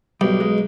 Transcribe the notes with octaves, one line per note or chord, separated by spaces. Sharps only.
B1 G3
G#3